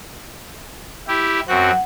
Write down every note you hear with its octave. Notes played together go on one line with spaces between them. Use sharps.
E4 G4
F#2 C4 F#4 F#5